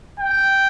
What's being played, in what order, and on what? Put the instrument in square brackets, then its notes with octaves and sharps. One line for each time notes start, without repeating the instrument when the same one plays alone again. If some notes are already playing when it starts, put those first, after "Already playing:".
[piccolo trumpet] G5